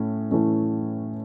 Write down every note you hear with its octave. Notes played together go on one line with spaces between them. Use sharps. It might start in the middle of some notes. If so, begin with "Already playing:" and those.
Already playing: A2 A3 C#4
A2 E3 A3 C#4